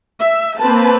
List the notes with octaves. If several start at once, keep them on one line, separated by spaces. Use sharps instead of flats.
E5
A#3 C4 B4 A5